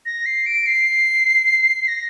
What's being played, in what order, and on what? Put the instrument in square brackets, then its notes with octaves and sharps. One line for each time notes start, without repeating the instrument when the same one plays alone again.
[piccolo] A#6
C7
D7
C7
A#6